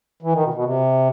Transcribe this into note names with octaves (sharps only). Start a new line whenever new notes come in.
E3
D#3
B2
B2
C3